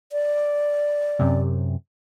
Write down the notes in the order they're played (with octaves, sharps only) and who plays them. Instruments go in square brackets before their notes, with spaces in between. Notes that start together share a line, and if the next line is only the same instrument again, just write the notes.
[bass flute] D5
[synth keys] F#2 C3